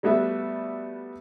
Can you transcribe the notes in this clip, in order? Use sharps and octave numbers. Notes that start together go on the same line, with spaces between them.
G3 A3 B3 F#4 E5